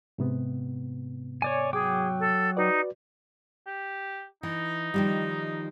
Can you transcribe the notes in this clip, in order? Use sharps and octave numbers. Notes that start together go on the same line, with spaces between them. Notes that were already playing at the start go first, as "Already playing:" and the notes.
G#2 C3 B3
C#5 D5 G#5
F#3 G#4 G5 D6
A4
D#4 F#4 B4 D5
G4
E3 D#4
D#3 F3 G3